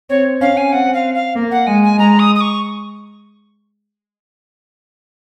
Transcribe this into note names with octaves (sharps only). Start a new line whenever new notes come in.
C4 C#5
C#4 F5
G#5
C4 F#5
F5
F5
A#3
F#5
G#3 G#5
G#5
G#3 A#5
D#6
D#6
C#6